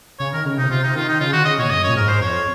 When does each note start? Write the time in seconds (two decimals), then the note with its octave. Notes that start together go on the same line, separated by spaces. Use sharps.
0.19 C#3 C#5
0.33 D#3 A#4
0.46 C#3
0.58 C3 D#4
0.70 C3 F4
0.83 D#4
0.95 D#3 F4
1.09 D#4
1.20 C#3 F4
1.33 D#3 F#4
1.45 C#3 D#5
1.58 A#2 C#5
1.70 F#2 D#5
1.84 C#5
1.88 A#2
1.95 G#2 A#4
2.08 C5
2.21 F2 C#5